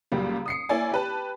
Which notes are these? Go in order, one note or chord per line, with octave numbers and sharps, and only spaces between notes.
C#2 A#2 F#3 G3 A#3
D#6 C7 C#7
A#3 E4 C#5 D5 G#5
G4 B4 A5